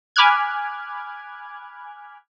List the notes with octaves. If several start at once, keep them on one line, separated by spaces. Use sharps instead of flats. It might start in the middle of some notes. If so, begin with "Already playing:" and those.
G#5 B5 D6 F6 F#6 G#6